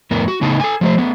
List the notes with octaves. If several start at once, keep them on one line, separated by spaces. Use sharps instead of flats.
F2 A2 B3 A#4
F#4
A2 C#3 B3 D#4 A5
A4 G#5
F3 A3 C5
A3 B3